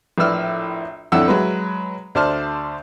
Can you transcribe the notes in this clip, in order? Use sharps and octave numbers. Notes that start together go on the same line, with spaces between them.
A#1 A2 B4 D5 E6 F6
F2 A2 D3 D5 F#5 E6
F#3 G#3 B4
D2 C5 D5 A5 F6